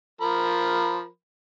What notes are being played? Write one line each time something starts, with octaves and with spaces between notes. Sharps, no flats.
F3 A#4 B5